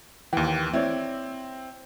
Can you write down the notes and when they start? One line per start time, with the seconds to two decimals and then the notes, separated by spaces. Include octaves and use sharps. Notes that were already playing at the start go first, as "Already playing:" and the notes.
0.33 D#2 E3 G5
0.73 C4 E4 C#5 D5